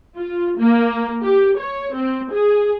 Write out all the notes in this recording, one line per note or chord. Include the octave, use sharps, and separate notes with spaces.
F4
A#3
G4
C#5
C4
G#4